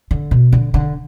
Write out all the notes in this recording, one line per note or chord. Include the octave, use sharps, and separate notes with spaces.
D3
B2
D3
D3